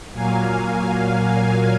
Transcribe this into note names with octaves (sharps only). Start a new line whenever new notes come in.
A#2 F#3 A#3 F5 G#5